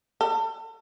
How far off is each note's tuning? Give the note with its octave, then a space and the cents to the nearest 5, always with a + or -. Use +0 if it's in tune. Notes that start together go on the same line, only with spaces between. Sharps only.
A4 +35